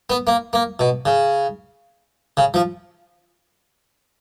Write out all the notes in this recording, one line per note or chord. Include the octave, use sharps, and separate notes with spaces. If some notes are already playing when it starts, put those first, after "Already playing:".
B3
A#3
A#3
B2
C#3
C#3
F3